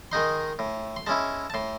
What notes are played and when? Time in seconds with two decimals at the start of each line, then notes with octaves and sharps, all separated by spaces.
0.12 D#3 G#3 D#4 C6
0.59 A2
0.96 C6
1.07 G#3 C#4 E4 A5
1.50 A5
1.54 A2 C6